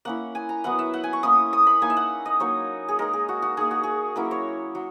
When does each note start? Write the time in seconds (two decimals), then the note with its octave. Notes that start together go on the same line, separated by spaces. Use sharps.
0.05 A#3 C#4 E4 F#5
0.35 G#5
0.49 A#5
0.64 F#3 B3 E4 F#5
0.79 E5
0.94 F#5
1.04 G#5
1.13 C#6
1.23 A#3 C#4 E4 D#6
1.53 D#6
1.67 B5
1.82 A#3 D#4 G#5
1.90 E5
1.97 F#5
2.26 D#5
2.40 F#3 A#3 D#4 C#5
2.88 G#4
2.99 G#3 D#4 A#4
3.13 G#4
3.29 F#4
3.42 F#4
3.57 A#3 D#4 G#4
3.71 F#4
3.83 G#4
4.16 F#3 A#3 C#4 E4 A#4
4.31 C#5
4.75 F#3